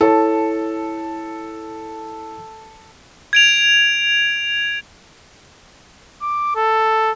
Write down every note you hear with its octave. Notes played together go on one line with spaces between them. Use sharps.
E4 A4 C#5 A5
G#6 D7 F7
D6
A4